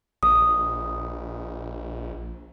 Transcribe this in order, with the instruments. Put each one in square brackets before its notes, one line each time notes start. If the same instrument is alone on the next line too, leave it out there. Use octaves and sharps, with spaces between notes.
[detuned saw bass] A#1 [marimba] D#6